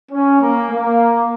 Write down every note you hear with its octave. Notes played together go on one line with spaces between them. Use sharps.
C#4
A#3
A#3